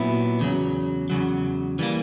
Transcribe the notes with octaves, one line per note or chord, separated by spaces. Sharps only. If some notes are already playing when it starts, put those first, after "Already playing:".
Already playing: A#2 F#3 B3 E4
E2 C#3 F#3
E2 C#3 F#3
E3 G3 A#3